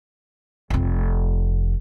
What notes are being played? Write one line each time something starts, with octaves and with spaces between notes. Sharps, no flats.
F1 C4